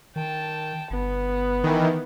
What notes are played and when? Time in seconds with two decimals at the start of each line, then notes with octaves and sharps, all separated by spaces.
0.16 D#3 G5 A5
0.90 G1 B3
1.64 D#3 E3